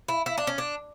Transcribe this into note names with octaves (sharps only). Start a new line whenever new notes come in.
E4
E4
D4
C#4
D4